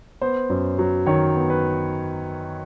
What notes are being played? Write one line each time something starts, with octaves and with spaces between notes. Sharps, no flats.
B3 C5
F#2
F#3
D#3 C#5
B3
B4